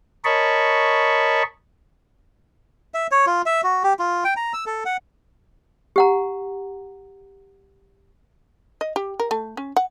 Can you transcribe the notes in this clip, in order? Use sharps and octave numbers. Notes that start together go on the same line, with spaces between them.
A#4 C#5 D#5 A5 B5 C#6
E5
C#5
F4
E5
F#4
G4
F4
G5
A#5
E6
A4
F#5
G4 F#5 A#5
D#5
G4
A#4
A3
C#4
F#5